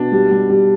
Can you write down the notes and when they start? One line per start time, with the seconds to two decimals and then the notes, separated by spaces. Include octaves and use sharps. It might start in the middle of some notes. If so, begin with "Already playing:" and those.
Already playing: B2 D4
0.12 G3
0.31 G3
0.50 G3